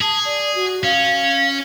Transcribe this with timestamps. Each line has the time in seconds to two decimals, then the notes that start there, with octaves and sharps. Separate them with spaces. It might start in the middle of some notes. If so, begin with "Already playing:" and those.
0.01 G#4 A5
0.25 D5
0.55 F#4
0.84 C#4 F5